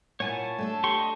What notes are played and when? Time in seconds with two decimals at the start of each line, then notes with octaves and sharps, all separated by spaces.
0.20 A#2 E4 C#5 F#5 G#5 A5
0.58 A3 D4 A4
0.84 G4 C6 C#6
0.99 D#5